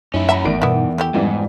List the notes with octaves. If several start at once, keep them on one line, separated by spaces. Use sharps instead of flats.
F#2 C#4 D#4 E4
E5 F#5 A#5 B5
G#1 E2 D3 D#3 A3 D5 D7
G2 B2 B3 E4
A3 B3 E4 G4
F2 G#2 E3 G3